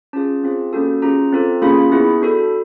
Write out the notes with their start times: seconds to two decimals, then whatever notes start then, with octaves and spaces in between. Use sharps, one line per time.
0.13 C#4 F4 G#4 A5
0.43 C4 F4 G#4
0.73 A#3 C#4 F#4 A4 A5
1.02 C#4 F4 G#4 A#5
1.32 C4 F4 A4
1.62 A#3 C#4 F4 G#4 B5
1.92 B3 E4 G#4
2.21 D4 F#4 A4